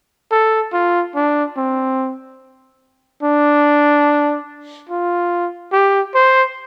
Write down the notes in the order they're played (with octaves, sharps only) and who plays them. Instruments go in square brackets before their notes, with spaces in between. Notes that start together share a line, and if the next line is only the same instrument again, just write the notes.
[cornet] A4
F4
D4
C4
D4
F4
G4
C5